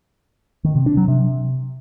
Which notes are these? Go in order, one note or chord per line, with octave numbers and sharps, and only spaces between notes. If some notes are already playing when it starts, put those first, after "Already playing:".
D#3
C3
D4
F#3
C3